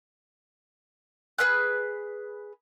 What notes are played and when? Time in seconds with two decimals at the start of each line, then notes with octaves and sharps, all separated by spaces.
1.38 G#4 B4 F6 F#6